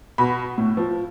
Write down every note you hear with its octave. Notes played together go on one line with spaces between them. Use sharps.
B2 B5
A2
F3